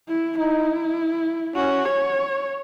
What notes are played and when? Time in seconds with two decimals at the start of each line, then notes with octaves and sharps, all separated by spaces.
0.08 E4
0.37 D#4 E4
1.56 C#4 F#4
1.85 C#5